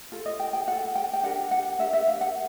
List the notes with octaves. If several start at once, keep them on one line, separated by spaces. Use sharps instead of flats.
F4 A4
D#5
G5
G5
F4 A4 F#5
G5
G5
D4 G4 A#4 F#5
F#5
D4 G4 A#4 E5
E5
F5
F#5